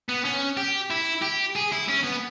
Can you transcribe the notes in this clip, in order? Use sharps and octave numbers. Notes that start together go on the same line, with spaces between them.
B3
C#4
G4
E4
G4
G#4
E4
C#4
B3